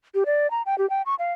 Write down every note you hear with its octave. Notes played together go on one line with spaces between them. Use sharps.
G4
D5
A#5
G5
G4
G5
C#6
F5